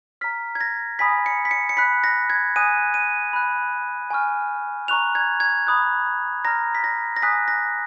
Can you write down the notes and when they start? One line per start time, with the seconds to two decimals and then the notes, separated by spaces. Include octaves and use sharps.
0.21 A#5 F6 B6
0.55 G#6
0.61 A#6
0.99 G#5 B5 D#6 B6
1.26 C#7
1.45 B6
1.51 C#7
1.69 C#7
1.77 B5 F#6 B6
2.04 A#6
2.30 G#6
2.56 G#5 D#6 F#6 D#7
2.94 D#7
3.33 B5 F#6
4.10 G#5 C#6 F6
4.88 A#5 C#6 F#6 F7
5.15 G#6
5.40 G#6
5.67 B5 D#6 F#6
6.45 A#5 F6 A#6
6.75 B6
6.84 A#6
7.16 A#6
7.22 G#5 D#6 F#6 B6
7.48 A#6